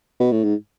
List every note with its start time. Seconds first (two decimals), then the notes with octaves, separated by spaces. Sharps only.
0.20 B2
0.32 A2
0.44 G#2